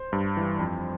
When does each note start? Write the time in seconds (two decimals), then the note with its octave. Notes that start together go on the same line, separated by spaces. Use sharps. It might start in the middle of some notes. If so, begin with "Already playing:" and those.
Already playing: C5
0.13 G2
0.37 E3 G3
0.59 F2